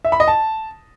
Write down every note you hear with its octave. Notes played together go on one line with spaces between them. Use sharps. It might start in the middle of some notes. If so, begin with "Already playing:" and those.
E5
B5
D#5
A5